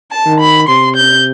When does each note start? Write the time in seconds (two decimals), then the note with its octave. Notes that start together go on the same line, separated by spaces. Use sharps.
0.12 A5
0.26 D#3
0.40 B5
0.68 C3 C6
0.96 G6